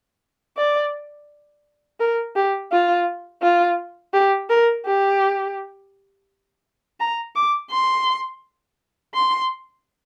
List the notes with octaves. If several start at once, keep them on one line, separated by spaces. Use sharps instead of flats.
D5
A#4
G4
F4
F4
G4
A#4
G4
A#5
D6
C6
C6